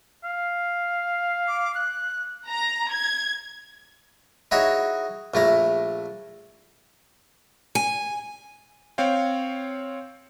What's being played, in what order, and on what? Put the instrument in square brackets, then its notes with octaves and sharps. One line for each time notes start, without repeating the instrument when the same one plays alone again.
[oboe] F5
[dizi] D6
F#6
[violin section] A#5
G#6
[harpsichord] D#4 E4 F#4 G#4 C#5
A#1 A3 E4 A#5
[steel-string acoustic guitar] G#5
[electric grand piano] C4 C#5 F5 G5